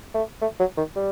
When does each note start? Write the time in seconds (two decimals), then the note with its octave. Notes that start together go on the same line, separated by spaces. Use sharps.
0.14 A3
0.42 A3
0.60 F#3
0.77 D#3
0.96 G3